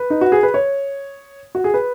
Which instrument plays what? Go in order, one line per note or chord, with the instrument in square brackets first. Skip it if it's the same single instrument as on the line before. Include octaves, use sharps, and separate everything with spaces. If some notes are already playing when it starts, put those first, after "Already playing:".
Already playing: [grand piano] B4
D#4
F#4
G#4
B4
C#5
F#4
G#4
B4